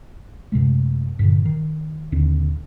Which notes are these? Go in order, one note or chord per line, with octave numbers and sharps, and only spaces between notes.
F#2 C3 G#3 A3
G2 A#2 D3
D#3
D#1 D#2 D3 C4